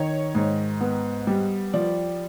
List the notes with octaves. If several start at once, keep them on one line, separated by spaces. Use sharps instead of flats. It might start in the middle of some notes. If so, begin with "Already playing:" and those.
Already playing: D#3 C#5
G#2
B3
G3
F3 D5